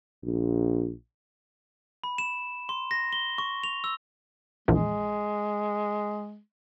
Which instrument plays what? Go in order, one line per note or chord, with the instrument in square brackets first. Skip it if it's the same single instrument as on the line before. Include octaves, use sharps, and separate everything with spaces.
[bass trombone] A#1
[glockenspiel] B5
E7
C6
A#6
G7
C#6
F7
E6
[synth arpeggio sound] A#1 E2 [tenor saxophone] G#3